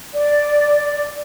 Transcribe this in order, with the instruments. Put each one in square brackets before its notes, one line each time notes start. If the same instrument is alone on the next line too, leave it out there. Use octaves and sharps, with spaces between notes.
[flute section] D5